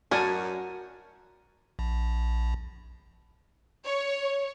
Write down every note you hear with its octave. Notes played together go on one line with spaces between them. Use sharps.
F#2 F#4 A#4 D5 G#5 A5
A#1
C#5